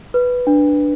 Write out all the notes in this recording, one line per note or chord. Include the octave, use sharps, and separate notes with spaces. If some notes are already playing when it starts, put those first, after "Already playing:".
B4
D4